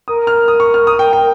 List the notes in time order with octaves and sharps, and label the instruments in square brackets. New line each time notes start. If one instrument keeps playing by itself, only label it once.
[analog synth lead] A#4 [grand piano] D#6
[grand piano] F6
D#6
C#6
F6
D#6
G5
G5